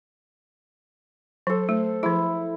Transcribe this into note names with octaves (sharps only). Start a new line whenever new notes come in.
F#3 A4 C5
A3
F3 E4 G#4